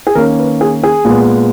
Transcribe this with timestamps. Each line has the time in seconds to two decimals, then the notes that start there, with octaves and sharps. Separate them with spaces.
0.07 G#4
0.15 D#3 A#3 C#4 A#4
0.39 B4
0.61 G#4
0.84 G#4
1.05 A#2 G#3 B3